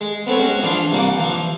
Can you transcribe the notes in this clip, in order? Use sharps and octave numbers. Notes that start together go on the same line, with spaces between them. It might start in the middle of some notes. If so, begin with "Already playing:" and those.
G#3
B3 C4 A4 C#5
G#3 C#4 F#4
E3 F3 D4 F4
C2 G3 A#3 F#5
E3 F3